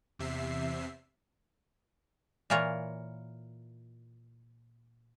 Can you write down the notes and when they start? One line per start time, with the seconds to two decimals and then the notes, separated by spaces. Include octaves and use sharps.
0.19 E2 C3 E5 C7
2.50 A#2 E3 F4 A#4 C#5